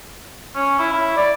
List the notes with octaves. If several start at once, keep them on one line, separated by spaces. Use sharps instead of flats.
C#4
E4
E4
D5